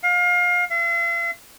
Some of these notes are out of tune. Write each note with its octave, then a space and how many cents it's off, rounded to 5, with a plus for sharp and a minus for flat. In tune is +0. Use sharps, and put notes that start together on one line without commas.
F5 +30
F5 -45